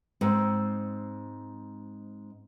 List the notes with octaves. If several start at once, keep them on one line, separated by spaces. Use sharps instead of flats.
G#2 C4